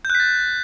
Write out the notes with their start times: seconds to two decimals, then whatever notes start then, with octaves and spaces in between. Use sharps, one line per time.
0.05 G6
0.10 F#6
0.15 B6
0.20 A6